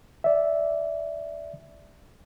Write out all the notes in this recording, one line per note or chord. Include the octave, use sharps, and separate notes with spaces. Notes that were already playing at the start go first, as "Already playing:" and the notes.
D5 E5